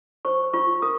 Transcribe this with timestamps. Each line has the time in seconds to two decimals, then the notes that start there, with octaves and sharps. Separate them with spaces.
0.25 C5 C#6
0.54 F4 C#6
0.82 A#4 D#6